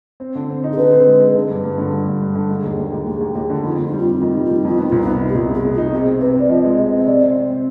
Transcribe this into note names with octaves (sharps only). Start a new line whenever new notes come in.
C4
D3
C4
D#4
G#4
D3 B4
C4
G#3
G#3
D3
G2
G2
D3
G2
G2
G2
D3
G#3 G#4
D#2
D#2
D#2
D#2 G#4
D#2
D#2 G#4
D3
F2 D#4
F2 F4
D#4
G3
F4
C3 D#4
D#3 F4
G3 D#4
F4
G3
D#4
F2 F4
B3 D#4
C2 F4
B3 D#4
D#4
G4
C2 F4
B3
G#4
B2
F4
D#4
C3 G#4
C4
C3 B4
C3 D5
F3 D#5
G#3
C3 D#5
C4
D#5
C3 D5
C4
C4
C4